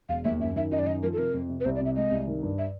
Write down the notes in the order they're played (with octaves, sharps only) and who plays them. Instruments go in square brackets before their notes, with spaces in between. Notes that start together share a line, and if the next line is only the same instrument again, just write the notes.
[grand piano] E1 [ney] F5
[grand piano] D#2 [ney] E5
[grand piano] F#2 [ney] E5
[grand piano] D#3 [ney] E5
[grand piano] F#2 [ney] D#5
[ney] D5
[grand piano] D#3 [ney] D#5
[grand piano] F3 [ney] A#4
[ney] A4
[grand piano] C3 [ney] A#4
[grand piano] F2
C3
[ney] B4
[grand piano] C2 [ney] C5
[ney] D5
[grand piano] C3 [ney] E5
[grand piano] G#3 [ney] D#5
[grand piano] C2
D#3
G2
[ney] E5